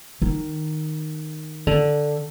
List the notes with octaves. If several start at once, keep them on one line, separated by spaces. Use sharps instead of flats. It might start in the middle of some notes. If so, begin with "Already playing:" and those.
D#3
D3